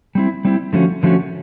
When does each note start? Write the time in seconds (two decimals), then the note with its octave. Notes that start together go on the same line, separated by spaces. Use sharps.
0.15 G3 C4 E4
0.45 G3 C4 E4
0.73 D3 F3 A3 C#4 F#4
1.03 D3 F3 A3 C#4 F#4